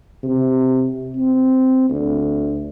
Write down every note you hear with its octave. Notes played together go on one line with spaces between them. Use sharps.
C3
C4
D2